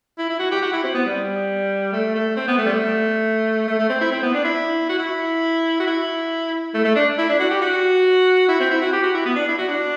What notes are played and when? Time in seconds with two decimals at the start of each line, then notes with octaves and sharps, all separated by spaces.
0.18 E4
0.30 E4
0.40 F#4
0.51 G4
0.62 F#4
0.73 E4
0.84 C4
0.94 B3
1.06 G3
1.93 A3
2.15 A3
2.37 C4
2.48 B3
2.58 A3
2.66 G3
2.69 A3
3.67 A3
3.79 A3
3.89 C4
4.01 E4
4.11 C4
4.23 B3
4.34 D4
4.45 E4
4.89 F#4
4.99 E4
5.80 F#4
5.87 E4
6.74 A3
6.85 A3
6.96 D4
7.18 E4
7.29 D4
7.40 F#4
7.51 G4
7.61 F#4
8.48 E4
8.60 C4
8.71 E4
8.82 F#4
8.93 G4
9.03 F#4
9.14 E4
9.25 B3
9.36 D4
9.48 E4
9.58 F#4
9.69 D4